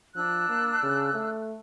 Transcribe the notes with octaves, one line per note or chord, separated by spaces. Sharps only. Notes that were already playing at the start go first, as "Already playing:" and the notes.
F3 D4 E6 F#6
A#3
C#3
A3